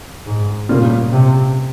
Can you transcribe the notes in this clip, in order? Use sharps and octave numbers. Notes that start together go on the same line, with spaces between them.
G#2
A#2 C#3 G3 A#3 F4
C3